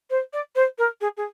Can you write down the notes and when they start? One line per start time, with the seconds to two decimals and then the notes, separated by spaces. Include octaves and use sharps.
0.10 C5
0.33 D5
0.56 C5
0.78 A#4
1.01 G#4
1.17 G#4